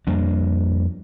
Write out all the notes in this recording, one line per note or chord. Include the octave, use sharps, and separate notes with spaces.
F2 G3 A#3 D4